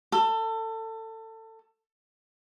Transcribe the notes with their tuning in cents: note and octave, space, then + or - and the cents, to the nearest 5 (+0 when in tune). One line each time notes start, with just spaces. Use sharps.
A4 +25